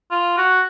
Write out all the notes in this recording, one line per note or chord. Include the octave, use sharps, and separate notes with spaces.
F4
F#4